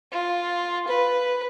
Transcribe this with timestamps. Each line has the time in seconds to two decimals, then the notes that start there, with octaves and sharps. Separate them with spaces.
0.12 F4
0.88 B4